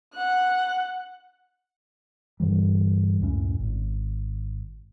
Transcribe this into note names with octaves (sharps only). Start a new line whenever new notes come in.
F#5 F#6
G2 D3 E3 G3
C#2 F#2 A2 C#4
G#1